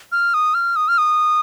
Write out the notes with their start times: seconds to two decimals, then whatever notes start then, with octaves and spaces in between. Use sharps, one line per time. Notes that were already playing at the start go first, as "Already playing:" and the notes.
0.12 F6
0.34 D#6
0.54 F6
0.76 D#6
0.88 F6
0.98 D#6